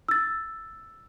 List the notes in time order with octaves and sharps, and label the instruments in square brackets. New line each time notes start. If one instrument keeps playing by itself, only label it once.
[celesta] E6 A6